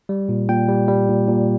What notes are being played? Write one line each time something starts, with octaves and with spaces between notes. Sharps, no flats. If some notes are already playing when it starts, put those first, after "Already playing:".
G3
A#2
A#2 G5
G3
G3
A#2
A#2